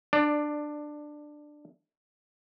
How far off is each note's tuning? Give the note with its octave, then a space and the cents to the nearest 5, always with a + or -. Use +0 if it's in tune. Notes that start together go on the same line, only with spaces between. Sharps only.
D4 +15 D5 +0